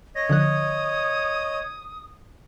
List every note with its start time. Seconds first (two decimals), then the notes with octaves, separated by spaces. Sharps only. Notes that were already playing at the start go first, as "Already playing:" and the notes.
0.15 C#5 D#5 A#6
0.30 D3 F3 D#6 F#6